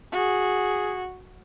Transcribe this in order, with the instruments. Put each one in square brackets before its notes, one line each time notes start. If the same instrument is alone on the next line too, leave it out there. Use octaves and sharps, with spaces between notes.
[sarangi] F#4 [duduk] G#4